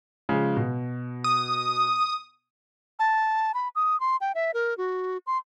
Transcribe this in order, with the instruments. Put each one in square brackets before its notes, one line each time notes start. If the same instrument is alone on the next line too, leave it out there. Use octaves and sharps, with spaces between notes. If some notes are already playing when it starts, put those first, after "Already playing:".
[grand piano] C#3 F3 G#3
B2
[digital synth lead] D#6
[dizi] A5
B5
D#6
C6
G5
E5
A#4
F#4
C6